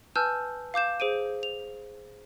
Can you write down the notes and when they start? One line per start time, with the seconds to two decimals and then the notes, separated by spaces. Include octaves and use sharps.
0.16 B4 G#5 A5 E6 F6 G6
0.74 F5 D6 G6 E7
1.00 G#4 C5 D7 D#7
1.43 F7